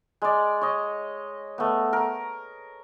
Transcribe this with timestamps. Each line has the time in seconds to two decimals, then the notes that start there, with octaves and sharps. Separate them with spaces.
0.22 G#3 D5
0.62 C#5 D#5
1.58 A3 B3
1.93 A#4